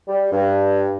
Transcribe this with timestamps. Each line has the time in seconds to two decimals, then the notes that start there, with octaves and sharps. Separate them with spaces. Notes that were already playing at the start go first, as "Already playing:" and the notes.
0.08 G3
0.31 G2